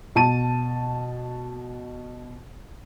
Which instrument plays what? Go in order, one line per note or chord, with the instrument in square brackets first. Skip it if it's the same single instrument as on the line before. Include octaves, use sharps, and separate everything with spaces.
[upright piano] B2 A5 D#7